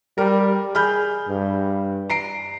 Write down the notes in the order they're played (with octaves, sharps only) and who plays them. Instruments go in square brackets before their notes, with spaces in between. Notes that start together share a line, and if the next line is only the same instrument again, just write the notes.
[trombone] G3 [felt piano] A#4
[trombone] G#4 [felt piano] B5 F6 G6
[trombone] G2
[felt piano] A#5 C7 D7